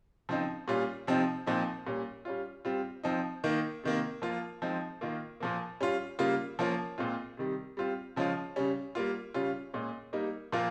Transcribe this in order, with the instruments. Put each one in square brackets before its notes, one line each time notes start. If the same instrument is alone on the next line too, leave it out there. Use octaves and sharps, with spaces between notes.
[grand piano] C#3 F3 C4 D#4
A#2 G3 C#4 F4
C3 F3 C4 D#4
A#2 F3 C4 D#4
A#2 G3 C#4
G3 C#4 F4
G3 C4 F4
F3 C4 D#4
D#3 A#3 D#4
C3 D#3 A#3
F3 A#3 F4
F3 G#3 C4 D#4
D#3 A#3 F4
A#2 F3 A#3
G3 C#4 F4
C#3 G3 A#3 F4
F3 A#3 C#4 F4
A#2 G#3 C4 F4
C3 D#3 G3
G3 C4 F4
C#3 F3 G#3 C#4 F4
C#3 G3 C#4
G3 A#3 F4
C#3 G3 C#4 F4
A#2 G#3 C#4
G3 A#3 D#4
A#2 F3 A#3 F4